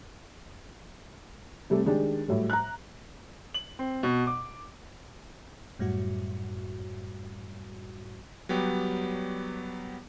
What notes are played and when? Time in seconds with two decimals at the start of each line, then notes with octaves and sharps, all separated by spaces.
1.70 C3 G3 A3
1.86 D#3 G#3 D4 G4
2.28 A2 F#3 G3
2.50 A#5 F#6
3.54 F#7
3.79 C4
4.03 B2
4.27 D6
5.79 F#2 A2 G3 F#4
8.49 F#3 G3 B3 G4